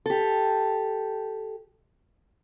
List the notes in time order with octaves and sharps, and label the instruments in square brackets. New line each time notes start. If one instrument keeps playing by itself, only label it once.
[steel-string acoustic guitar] G4 A4